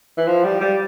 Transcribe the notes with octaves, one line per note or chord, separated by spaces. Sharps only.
E3
F3
G3
G3